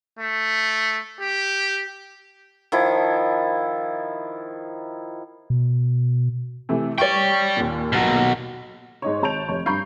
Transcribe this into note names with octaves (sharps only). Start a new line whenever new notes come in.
A3
G4
D#3 F3 E4
B2
C3 E3 A3
C#5 D5 G5 C#6
D#2 A#2
B2 F#3
G#2 D#4 C#5
G#1 C#5 A5 G6 D7 F7
F1 C#5
G2 A#5 B5 C#6 G6 C7